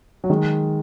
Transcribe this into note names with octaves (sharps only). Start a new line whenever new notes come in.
F#3
D#3 G#3